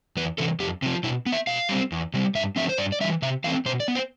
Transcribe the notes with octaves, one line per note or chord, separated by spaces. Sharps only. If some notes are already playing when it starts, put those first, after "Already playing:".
E2 B4
C3 E3 A4
F2 G4
C3 F3
B2 E4
B3
E5
B2 F5
G3 C4
E2
C3 G3
G2 E5
D3 F3 A3 C4 E5
C5
G2 D5
D5
E3 G3 E5
C3 E5
E3 A3 C4 F5
B2 C5
D5
B3
C5